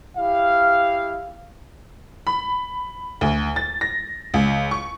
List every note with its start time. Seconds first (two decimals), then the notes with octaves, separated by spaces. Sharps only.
0.17 E4 G4 F5
2.27 B5
3.21 D2
3.56 A6
3.81 A#6
4.34 C#2
4.71 C#6